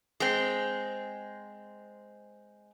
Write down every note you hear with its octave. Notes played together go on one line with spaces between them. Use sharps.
G#3 C4